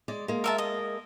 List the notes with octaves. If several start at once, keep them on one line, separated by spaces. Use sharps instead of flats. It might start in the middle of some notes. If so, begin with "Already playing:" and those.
G#3 D5
G#3 A#3
A#4 E5 A5
D#5